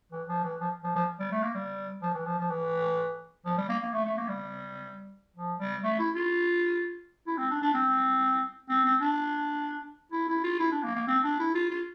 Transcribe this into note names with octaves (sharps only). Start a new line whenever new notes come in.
E3
F3
E3
F3
F3
F3
G3
A3
A#3
G3
F3
E3
F3
F3
E3
F3
G3
A#3
A#3
A3
A3
A#3
G3
F3
G3
A3
E4
F4
E4
C4
D4
D4
C4
C4
C4
D4
E4
E4
F4
E4
D4
A#3
A#3
C4
D4
E4
F4
F4